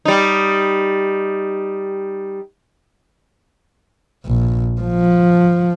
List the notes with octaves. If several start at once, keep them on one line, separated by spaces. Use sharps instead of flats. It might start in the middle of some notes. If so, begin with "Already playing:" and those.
G3 D#4
A#1
F3